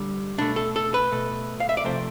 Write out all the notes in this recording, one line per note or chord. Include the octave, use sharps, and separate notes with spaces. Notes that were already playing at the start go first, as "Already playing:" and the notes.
Already playing: D3 G3
B2 A3 D4
A4
A4
B4
B2 A3
F5
E5
D5
C3 F3 A3 C5